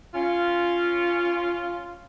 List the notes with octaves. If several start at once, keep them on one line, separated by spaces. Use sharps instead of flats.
C#4 F4